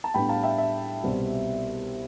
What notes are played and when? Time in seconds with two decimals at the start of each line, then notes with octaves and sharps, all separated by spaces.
0.04 A5
0.14 A2 G3 B3 D4 G5 B5
0.29 F5 A5
0.43 E5 G5
0.58 E5
1.03 C2 B2 G3 C4